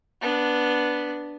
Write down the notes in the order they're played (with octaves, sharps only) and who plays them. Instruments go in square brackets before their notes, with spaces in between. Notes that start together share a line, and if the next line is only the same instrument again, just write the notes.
[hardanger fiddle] B3 D4